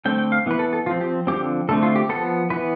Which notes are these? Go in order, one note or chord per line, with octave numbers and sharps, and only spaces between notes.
D3 A3 C4 G5
G5
F5
E3 B3 B4
A4
A4
F3 C4 F4
G4
D3 F3 A3 C4 G4
D3 A3 C4 A4
F4
G4
F3 B3 A4
E3 B3 B4